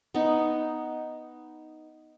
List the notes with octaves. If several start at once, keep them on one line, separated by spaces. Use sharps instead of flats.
B3 D#4